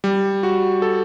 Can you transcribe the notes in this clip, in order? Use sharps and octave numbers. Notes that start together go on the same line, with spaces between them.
G3
F#4
A4